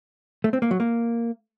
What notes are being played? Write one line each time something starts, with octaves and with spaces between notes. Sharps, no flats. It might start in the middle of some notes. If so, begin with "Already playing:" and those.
A3
C4
A#3
F#3
A#3